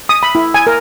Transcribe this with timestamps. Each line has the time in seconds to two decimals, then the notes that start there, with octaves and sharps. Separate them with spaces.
0.09 D#6
0.23 B5
0.35 E4
0.54 G#5
0.67 A#4